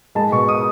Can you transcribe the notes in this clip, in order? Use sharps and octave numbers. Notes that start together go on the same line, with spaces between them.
G#3 A5
B2 C#6
D#6